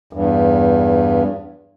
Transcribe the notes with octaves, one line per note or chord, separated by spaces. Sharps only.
E2 G2